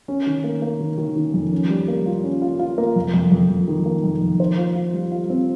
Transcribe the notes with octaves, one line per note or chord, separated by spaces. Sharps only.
C#4
D#3
A#3
A#3
D#3
D#3
D#3
F2
C#4
G3
A#3
F4
C#4
F4
F4
A#3
F2
F2
F2
F2
D#3
A#3
F2
F2
C5
F4
F4
G3
F4
C4